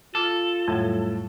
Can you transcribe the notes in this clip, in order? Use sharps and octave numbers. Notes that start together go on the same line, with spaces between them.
F4 A4 D6 F6 A6
F2 A2 F#3 G3